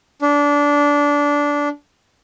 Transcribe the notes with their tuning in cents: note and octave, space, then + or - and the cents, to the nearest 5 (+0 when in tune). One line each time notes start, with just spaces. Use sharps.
D4 -20